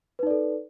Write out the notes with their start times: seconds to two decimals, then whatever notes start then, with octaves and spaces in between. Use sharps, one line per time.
0.19 B4
0.23 D#4
0.27 D5
0.31 A4